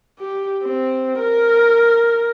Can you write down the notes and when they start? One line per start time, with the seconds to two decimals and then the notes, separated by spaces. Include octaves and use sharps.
0.19 G4
0.64 C4
1.20 A#4